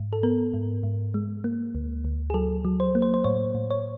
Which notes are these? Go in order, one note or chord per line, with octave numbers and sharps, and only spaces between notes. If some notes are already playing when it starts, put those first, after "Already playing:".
Already playing: G#2
A4
B3 A#4
G#2
G#2
G#3
A#3
D2
D2
G#4
F#3 A4
F#3
C5
A#3
C5
C5
A2 C#5
A2
C#5